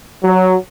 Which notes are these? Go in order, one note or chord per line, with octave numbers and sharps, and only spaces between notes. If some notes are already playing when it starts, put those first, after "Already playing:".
F#3